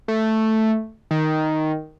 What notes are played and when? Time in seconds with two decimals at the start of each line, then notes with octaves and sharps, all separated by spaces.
0.08 A3
1.11 D#3